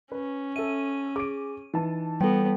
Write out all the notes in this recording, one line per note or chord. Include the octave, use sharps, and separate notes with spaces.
C#4 B4
A4 E5 D#7
G#4 D6 D7
E3 D#4 A5
G3 B3 A4 G5